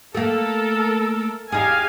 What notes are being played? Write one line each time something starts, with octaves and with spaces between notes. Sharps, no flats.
A3 A#3 A4 A#4
E2 D#4 G4 G#4 F5 G#5